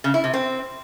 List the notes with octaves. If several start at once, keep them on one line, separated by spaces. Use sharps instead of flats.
C#3
E4
C3
C4